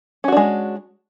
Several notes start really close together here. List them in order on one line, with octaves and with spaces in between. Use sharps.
C#4 F#4 D4 G#3